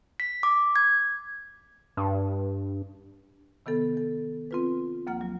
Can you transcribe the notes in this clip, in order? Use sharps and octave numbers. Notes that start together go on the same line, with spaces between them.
B6
D6
G#6
G2
C3 D#3 B3 A4
A4
C4 F4 B4
D2 F3 A#3 F#5 F6
F#3